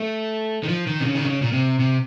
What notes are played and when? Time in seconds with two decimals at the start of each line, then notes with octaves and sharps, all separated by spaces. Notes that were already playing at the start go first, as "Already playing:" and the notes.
Already playing: A3
0.63 D#3
0.69 F3
0.87 D#3
1.00 C3
1.05 C#3
1.15 D#3
1.24 C#3
1.42 A#2
1.52 C3
1.79 C3